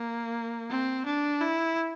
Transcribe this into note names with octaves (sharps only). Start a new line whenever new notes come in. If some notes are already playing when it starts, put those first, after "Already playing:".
Already playing: A#3
C4
D4
E4